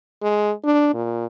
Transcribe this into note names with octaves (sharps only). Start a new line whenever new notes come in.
G#3
D4
A#2